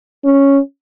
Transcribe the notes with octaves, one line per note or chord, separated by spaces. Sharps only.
C#4